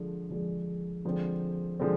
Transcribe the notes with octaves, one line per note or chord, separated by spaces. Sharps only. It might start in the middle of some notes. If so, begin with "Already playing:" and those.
Already playing: D3 F3 G#3
D3 F3 G#3
D3 F3 G#3 C4
D3 F3 G#3 C4